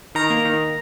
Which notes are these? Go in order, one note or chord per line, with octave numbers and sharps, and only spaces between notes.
D#3 A#5
A#3
D#3